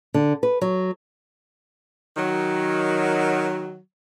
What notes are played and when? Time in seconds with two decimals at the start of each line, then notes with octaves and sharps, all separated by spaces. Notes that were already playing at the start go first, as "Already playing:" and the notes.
0.14 D3
0.43 B4
0.62 F#3
2.17 D#3 F#3